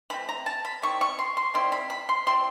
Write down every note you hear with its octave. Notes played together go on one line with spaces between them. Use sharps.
E3 A3 C4 B5
A#5
A5
B5
D#3 G3 C4 E4 C#6
C#6
C6
C6
D#3 G3 C4 E4 C6
B5
B5
C6
G3 C4 E4 C6